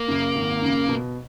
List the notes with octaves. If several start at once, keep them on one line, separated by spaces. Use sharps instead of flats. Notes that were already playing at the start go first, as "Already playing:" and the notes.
Already playing: A#3
F#2 C#3
G#1
F#2 C#3
B2